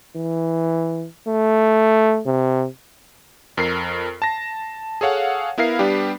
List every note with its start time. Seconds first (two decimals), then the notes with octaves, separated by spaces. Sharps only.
0.16 E3
1.28 A3
2.26 C3
3.57 F2 A#4 C7
4.22 A5 A#6
5.01 G#4 A4 C#5 F5 F#5
5.58 B3 E4 A#4 F5 C7
5.79 G3 B3 D4 G4